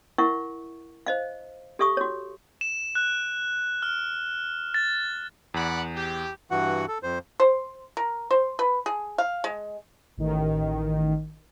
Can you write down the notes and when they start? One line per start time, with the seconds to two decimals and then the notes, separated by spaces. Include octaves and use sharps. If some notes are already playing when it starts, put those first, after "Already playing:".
0.18 E4 A#4 E5 F#5 C#6
1.06 C5 D#5 F5
1.79 G4 A4 E5 C#6 D#6
1.97 F#4 C#5
2.61 E7
2.95 F#6
3.82 F6
4.74 A6
5.54 E2 D5 F#5 B5
5.94 G4
6.51 G2 E3 F#4 F#5
6.88 A4
7.03 F2 C5
7.40 C5
7.97 A#4
8.31 C5
8.59 B4
8.86 G#4
9.18 F5
9.44 G#3
10.17 A1 D#3